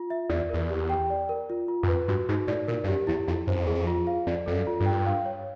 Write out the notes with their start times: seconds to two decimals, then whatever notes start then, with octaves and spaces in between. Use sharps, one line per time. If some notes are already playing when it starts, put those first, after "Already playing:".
Already playing: F4
0.10 E5
0.29 E2 D5
0.49 E2 A#4
0.70 G4
0.89 G5
1.10 D5
1.29 A#4
1.50 F4
1.68 F4
1.83 F#2
1.88 F2 B4
2.08 G2 F#4
2.29 G#2 D#4
2.48 A2 D5
2.68 A#2 A#4
2.84 G2
2.88 F#2 G4
3.07 E2 E4
3.27 F2 E4
3.47 F#2 C5
3.56 F2
3.66 E2 G#4
3.75 F2
3.87 F4
4.07 F5
4.27 F2 D5
4.46 F2 A4
4.54 F#2
4.67 F4
4.80 G2
4.86 G5
5.06 F5
5.25 C#5